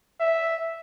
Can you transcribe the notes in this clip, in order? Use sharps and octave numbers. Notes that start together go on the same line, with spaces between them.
E5